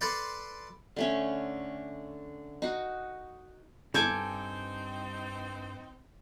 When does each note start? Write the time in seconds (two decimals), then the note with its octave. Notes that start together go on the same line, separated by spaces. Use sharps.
0.01 A4 B4 D5 C6
0.96 D3 A3 C#4
2.62 D#4 F#4
3.94 G2 C4 D#4 A4 G#5 D6 G6